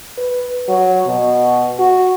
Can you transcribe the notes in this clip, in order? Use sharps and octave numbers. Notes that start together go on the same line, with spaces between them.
B4
F#3
B2
F#4